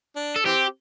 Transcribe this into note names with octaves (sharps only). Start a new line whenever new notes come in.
D4
A4
E3 C4 G4